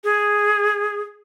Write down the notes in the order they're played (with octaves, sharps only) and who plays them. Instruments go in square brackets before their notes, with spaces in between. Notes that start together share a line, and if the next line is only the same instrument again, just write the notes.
[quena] G#4